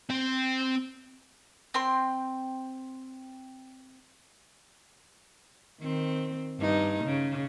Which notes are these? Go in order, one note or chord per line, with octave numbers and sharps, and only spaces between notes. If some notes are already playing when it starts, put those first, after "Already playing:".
C4 G5
C4 G5 C6
D#3 C4
G2 D#4
C#3